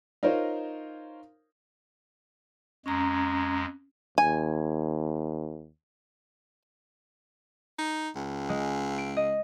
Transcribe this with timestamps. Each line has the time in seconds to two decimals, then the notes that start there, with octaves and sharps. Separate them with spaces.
0.23 D#4 F4 A#4 C5 C#5
2.86 F2 G#3 C#4 A#5
4.18 D#2 G#5
7.79 D#4
8.16 C#2
8.49 G#3
8.98 D7
9.17 D#5